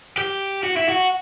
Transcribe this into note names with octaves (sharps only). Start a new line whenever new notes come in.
G4
F#4
E4
F#4